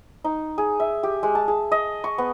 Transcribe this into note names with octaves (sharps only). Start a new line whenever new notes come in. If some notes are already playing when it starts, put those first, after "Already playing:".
D#4
G#4
E5
G4
G#3
A5
G#4
D#5
C#6
B3